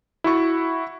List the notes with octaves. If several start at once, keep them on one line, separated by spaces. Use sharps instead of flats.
E4 F#4 C#6